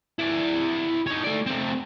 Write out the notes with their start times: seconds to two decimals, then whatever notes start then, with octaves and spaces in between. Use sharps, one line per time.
0.19 E4 D5
1.07 D#4 C#5
1.24 A3 D5
1.46 A3 C4